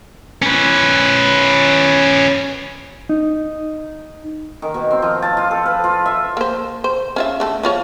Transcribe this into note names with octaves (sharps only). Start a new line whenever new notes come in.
C#4 B4
D#4
D#3
B2
C4
F3
A5
F4
A4
B4
F4
E5
A#3 C5
C5
C#4 F4 E5
D3 A3 A4
F3 F4 C#5